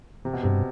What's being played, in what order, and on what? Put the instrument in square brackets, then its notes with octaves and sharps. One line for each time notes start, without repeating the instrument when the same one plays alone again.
[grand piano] C3
B2
[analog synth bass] G2 [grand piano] C3